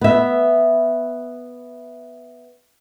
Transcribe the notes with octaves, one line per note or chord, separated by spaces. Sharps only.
B3 E5